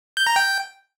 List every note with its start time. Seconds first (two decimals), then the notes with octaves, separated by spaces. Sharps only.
0.17 G6
0.27 A#5
0.36 G5